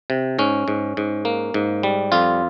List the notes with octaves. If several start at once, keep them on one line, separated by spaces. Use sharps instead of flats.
C3
G#2 C#4
G#2
G#2
A#3
G#2
G3
F2 F4